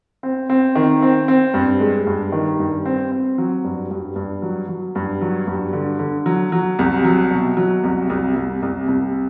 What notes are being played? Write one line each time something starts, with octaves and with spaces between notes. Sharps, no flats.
C4
C4
D#3
C4
C4
G2
G#3
G2
D#3
G2
C4
C4
F#3
G2
G2
G2
F#3
F#3
G2
F#3
G2
D3
D3
F#3
F#3
C2
F#3
B2
F#3
C2
C2
C2
C2
C2